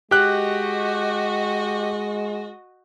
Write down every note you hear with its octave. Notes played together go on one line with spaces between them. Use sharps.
G#3 F#4 G4 D#5 F#6